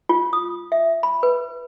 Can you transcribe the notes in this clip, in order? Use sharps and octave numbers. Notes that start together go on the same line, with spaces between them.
F4
D#6
E5
B5
B4